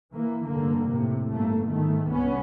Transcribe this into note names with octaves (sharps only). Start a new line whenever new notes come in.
E3 A#3
F1 G2 D3 A#3
A2 C3
G1 A3 A#3
G#2 D#3 A3
C2 B3 C#4